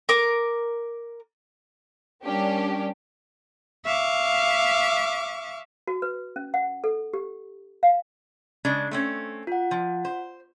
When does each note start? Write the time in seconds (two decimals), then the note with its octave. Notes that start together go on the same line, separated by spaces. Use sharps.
0.09 A#4 D6
2.24 G3 A#3 C#4 D4 G4
3.85 E5 F5 C#6 D6
5.88 F#4
6.02 B4
6.36 C#4
6.54 F#5
6.84 A4
7.14 G4
7.83 F5
8.65 C#3 G#3 D4
8.91 A3 C4 C#4
9.47 F4 F#5
9.71 F3
10.05 C5